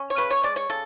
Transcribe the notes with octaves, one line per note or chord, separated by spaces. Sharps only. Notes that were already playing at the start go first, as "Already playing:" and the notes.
Already playing: C#4
C#5
C#3 B4
C#5
G#3 D5
C#5
C#3 A4